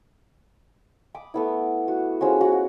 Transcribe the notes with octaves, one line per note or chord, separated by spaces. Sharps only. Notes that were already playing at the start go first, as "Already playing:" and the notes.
B5 D6 D#6
A3 B3 E4
F#4
F3 G#3 C#4 F#4
F#4 F#5